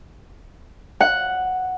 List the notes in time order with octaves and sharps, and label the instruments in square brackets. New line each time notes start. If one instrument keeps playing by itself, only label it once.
[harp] F#5